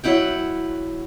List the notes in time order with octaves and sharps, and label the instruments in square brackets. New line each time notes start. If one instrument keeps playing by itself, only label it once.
[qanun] F#3 E4 F#5 G5